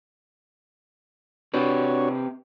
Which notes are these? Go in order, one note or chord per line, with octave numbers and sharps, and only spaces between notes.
C4 D4 F#4 G4 B4 C#5